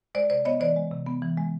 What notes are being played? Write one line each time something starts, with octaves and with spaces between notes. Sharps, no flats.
G#3 C5 D5
C3 C5 D5
B3 C#5 D#5
E3 C5 D5
G#3
C3
B3
E3
G#3